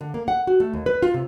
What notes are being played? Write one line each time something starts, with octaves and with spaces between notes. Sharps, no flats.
D3
A#3
F#5
F#4
A3
D#2
B4
F4
C3